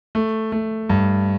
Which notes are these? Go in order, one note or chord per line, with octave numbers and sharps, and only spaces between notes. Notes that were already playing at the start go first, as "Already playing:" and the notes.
A3
A3
G2